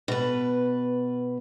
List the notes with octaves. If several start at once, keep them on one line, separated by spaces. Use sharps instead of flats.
B2 B4